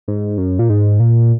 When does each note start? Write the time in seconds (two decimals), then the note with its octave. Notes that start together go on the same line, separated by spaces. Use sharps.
0.08 G#2
0.38 F#2
0.59 A#2
0.69 G#2
1.00 A#2